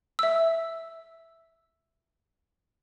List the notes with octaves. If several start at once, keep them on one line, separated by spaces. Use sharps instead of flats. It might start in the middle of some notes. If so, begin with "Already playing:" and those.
E5 E6